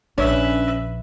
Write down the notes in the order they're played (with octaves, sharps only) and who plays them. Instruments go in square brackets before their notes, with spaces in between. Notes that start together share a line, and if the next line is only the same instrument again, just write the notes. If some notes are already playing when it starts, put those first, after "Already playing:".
[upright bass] A#1 [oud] C#4 [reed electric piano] D4 [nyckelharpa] B4 E5